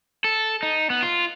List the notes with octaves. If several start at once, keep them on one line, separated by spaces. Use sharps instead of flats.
A4
D#4
B3
F4